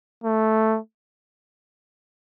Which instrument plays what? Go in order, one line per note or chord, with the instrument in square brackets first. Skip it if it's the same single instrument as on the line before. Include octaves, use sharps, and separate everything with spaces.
[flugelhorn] A3